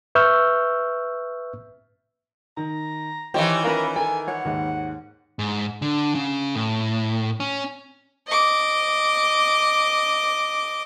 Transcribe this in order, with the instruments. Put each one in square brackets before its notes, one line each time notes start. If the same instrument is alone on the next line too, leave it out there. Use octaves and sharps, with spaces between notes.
[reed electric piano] B4 E5 C#6 E6 F6 G6
[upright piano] D#3 [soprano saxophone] A#5
[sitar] D#3 E3 [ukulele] G4 D#5 [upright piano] C5 C#5 B5
[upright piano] C#4 F4 B4 [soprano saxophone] A#4 [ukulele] F5 B5
[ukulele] A4 [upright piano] A#4 [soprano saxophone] G#5
[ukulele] C#5 [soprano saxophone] F#5
[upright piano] D#2 G#2
[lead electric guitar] G#2
D3
C#3
A2
C#4
[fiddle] D#5 D6